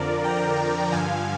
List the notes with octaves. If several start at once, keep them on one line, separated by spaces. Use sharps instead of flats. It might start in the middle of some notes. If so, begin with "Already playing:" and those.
Already playing: F2 D3 F3 A#4 D5
G5 A#5
G2 D3 F3 F5 G#5